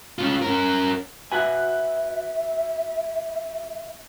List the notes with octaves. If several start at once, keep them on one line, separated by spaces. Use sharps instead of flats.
C#4 F4
C#4 A#4
F#4 B4 E5 G#5